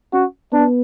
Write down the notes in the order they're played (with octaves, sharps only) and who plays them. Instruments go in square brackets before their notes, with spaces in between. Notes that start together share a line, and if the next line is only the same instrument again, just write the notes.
[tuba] C#4 [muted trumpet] F#4
[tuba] B3 [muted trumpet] D4